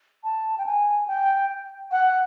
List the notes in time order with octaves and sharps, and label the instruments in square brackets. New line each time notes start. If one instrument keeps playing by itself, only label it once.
[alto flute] A5
G5
G#5
G5
F#5